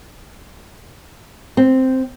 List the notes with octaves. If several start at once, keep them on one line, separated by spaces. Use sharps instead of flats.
C4